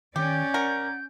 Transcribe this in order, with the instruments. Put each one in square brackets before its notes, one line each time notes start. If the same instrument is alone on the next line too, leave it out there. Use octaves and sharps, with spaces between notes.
[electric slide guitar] D#3 [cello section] C#4 D5 [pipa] G4 [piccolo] G6
[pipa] A#4 [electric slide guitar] F#5